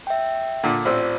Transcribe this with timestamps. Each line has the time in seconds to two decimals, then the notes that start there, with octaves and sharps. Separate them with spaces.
0.07 E5 G5
0.64 A#2 D3
0.85 A1 C4 F4 C5 D5 E6